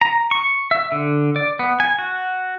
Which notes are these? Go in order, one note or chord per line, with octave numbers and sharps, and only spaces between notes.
A#5
C#6
E5
D3
D5
B3
G#5
F#4